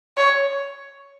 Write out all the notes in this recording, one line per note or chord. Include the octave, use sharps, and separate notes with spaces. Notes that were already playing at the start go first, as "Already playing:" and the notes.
C#5